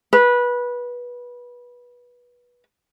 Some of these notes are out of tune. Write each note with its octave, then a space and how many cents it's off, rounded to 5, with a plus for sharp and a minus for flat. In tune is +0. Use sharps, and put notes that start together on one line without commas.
B4 -20